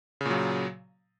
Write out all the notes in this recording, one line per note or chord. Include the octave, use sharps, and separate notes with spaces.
A#2 C#3 F#3